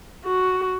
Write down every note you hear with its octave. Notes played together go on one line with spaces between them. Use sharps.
F#4